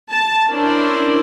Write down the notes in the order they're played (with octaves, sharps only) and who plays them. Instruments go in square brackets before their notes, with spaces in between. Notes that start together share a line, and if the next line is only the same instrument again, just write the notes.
[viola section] A5
C#4 D4 E4 A#4 C5 D5